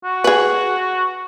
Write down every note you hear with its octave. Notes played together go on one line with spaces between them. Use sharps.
F#4
G#4 B4